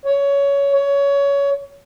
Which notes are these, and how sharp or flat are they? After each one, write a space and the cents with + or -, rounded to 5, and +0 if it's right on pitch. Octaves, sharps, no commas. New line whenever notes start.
C#5 +15
C#5 +20